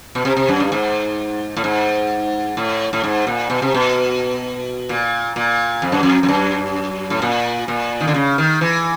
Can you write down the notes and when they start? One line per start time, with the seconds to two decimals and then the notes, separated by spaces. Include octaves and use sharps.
0.15 B2
0.25 C3
0.37 C3
0.49 F#2
0.60 G2
0.72 G#2
1.57 A2
1.64 G#2
2.57 A2
2.93 A2
3.04 G#2
3.27 A#2
3.50 B2
3.62 C3
3.74 B2
4.89 A#2
5.36 A#2
5.82 F2
5.92 F#2
6.03 F2
6.23 F2
6.29 F#2
7.10 A2
7.22 A#2
7.68 A#2
8.01 D#3
8.07 D3
8.14 C#3
8.38 D#3
8.61 E3